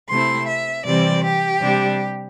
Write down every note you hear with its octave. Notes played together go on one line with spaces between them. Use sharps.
C3 A3 C4 E4 C6
E5
C3 E3 G3 C4 D5
G4
C3 G3 D4